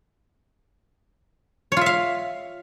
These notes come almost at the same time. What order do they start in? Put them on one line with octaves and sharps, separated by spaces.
C#5 F4 E5 F5